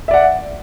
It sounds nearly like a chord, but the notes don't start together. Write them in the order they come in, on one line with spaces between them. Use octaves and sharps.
E5 D5 F#5